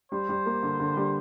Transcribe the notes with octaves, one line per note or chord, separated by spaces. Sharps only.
G3 C5
G3
A#3
D3
D3
G3